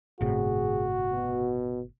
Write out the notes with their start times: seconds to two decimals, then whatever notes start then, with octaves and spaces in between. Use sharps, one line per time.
0.21 G1 A2 C3 F#4 G#4
1.12 B2